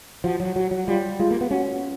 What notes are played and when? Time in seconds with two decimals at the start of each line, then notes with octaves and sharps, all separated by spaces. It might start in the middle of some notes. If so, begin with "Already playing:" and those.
0.24 F3 F#4
0.40 F#3
0.56 F#3 F#4
0.71 F#3
0.87 G3 F4
1.19 G#3 F4
1.31 A#3
1.41 B3
1.51 C#4 F#4